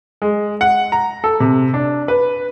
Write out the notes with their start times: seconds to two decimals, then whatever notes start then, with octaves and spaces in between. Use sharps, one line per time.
0.22 G#3
0.61 F#5
0.92 A#5
1.24 A4
1.40 C3
1.74 D4
2.08 B4